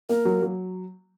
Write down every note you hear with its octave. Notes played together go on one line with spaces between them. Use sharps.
A#3 A#4
F#3
F#3